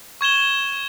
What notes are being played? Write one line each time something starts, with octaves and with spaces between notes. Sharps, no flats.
C#6 G#6 E7 G7